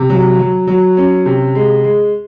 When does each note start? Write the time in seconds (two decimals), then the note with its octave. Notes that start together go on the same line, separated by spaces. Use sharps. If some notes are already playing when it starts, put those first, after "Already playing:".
Already playing: C3
0.10 F#3
0.39 F#3
0.67 F#3
0.97 C#4
1.26 C3
1.55 G#3
1.84 G#3